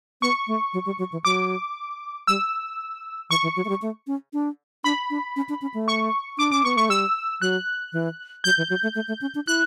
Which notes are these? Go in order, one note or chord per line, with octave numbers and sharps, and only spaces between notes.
B3 C#6
A3
F#3
G3
F#3
E3
F#3 D6
G3 E6
E3 C#6
E3
F#3
A3
G3
A3
C#4
D4
D4 B5
D4
C#4
D4
C#4
A3
C#6
D4 D6
C#4 D6
B3 C#6
A3 C#6
G3 E6
F#3 F#6
E3
F#3 G6
E3
F#3
A3
A3
A3
C#4
D4
E4 F#6